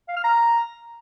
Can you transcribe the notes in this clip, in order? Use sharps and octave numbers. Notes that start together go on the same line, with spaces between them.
F5
F6
A#5